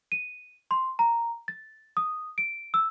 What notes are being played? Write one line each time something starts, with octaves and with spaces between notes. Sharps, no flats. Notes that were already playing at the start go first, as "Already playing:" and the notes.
D#7
C6
A#5
A6
D#6
D7
E6